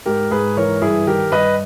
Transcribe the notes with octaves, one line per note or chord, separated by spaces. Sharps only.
G#2 G4 A#4
G#2 G#4 B4
E3 A#4 C#5
G2 E4 G#4
D#3 G4 A#4
G2 B4 D#5